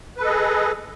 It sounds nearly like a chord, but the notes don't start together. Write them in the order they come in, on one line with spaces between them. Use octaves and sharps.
B4 A4 D#5 G#4